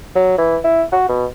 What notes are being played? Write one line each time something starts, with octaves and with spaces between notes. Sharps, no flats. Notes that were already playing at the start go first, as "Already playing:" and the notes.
F#3
E3
E4
F#4
B2